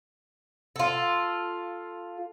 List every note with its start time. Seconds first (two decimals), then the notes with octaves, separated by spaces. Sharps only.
0.76 F4 A4